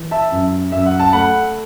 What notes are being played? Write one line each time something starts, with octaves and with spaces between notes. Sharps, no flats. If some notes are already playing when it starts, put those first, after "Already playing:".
Already playing: E3
E5 A5
F#2
F#2 E5
F#5
A5
A3 F#5 B5